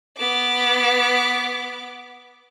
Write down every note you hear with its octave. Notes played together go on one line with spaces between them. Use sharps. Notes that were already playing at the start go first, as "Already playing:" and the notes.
B3 D6